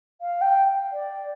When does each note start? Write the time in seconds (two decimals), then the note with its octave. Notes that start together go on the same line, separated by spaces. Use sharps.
0.21 F5
0.41 G5
0.92 D5